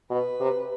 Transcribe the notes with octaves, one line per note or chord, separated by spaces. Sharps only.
B2 B4
C3